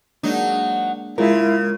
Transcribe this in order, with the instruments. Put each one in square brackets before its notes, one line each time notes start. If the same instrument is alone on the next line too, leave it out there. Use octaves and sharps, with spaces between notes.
[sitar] F#3 D#4 [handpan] G#3 A#3 D4
[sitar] C#3 [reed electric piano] G#3 A#4 [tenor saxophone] E4 [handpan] F4